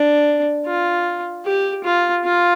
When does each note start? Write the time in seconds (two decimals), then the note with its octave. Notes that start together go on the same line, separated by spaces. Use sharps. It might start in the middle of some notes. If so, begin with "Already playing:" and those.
Already playing: D4
0.66 F4
1.45 G4
1.84 F4
2.24 F4